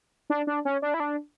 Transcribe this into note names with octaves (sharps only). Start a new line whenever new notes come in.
D4
D4
C#4
D4
E4
D4